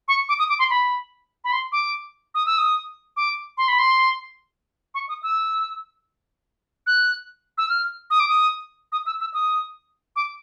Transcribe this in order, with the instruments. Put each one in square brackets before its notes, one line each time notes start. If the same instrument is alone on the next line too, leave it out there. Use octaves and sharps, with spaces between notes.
[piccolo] C#6
D6
D#6
D6
C6
B5
B5
C6
D6
D#6
E6
D#6
D6
C6
B5
C6
C#6
D#6
E6
F#6
E6
F6
D#6
D6
D#6
D#6
E6
E6
D#6
D6